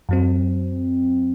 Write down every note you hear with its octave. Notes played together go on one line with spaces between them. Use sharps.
F#2 F#3 C4